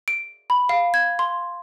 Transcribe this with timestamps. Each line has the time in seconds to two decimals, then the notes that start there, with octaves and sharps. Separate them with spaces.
0.08 D7
0.50 B5
0.69 F5
0.94 G#6
1.19 C6